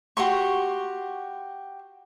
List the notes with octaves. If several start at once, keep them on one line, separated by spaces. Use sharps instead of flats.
F#4 G4 C6 C#6